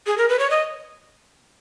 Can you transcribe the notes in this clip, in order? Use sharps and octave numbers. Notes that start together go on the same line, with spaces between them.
G#4
A#4
B4
C#5
D#5